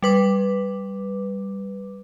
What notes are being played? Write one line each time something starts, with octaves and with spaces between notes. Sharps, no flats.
G3 B4 D6